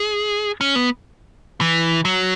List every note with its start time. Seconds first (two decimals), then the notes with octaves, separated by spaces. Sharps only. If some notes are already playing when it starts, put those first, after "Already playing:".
Already playing: G#4
0.61 C#4
0.75 B3
1.61 E3
2.05 F#3